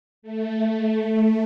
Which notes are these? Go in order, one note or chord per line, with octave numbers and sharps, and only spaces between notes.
A3